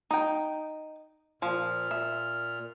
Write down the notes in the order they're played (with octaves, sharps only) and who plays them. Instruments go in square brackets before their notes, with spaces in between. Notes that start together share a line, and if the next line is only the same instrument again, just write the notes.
[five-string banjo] D#4 G5
[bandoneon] A#2 F6 [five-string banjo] F3
[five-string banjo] E5